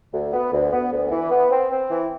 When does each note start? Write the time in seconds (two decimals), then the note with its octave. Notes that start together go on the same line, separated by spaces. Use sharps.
0.13 D2
0.33 B3
0.52 D2
0.72 B3
0.92 D2
1.11 E3
1.31 B3
1.50 C4
1.71 C4
1.90 E3